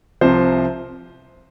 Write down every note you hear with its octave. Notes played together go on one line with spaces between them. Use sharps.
C2 C3 F3 C5